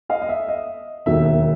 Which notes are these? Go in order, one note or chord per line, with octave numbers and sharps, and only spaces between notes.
D#5 F5
D#5
E5
D#5
E1 D#2 D#3 F#3 E5
E5